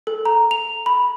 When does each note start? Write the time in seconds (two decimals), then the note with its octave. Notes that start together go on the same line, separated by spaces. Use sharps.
0.07 A4
0.25 A#5
0.51 F7
0.86 B5